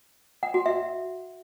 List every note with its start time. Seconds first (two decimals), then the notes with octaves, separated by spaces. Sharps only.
0.43 F#5
0.54 F#4
0.66 E5